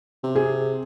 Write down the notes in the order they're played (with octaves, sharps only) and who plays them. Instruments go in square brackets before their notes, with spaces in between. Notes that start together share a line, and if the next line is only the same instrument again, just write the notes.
[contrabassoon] C3
[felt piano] G#4